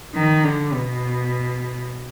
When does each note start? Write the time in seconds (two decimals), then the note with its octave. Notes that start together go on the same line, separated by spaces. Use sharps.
0.15 D#3
0.44 D3
0.73 B2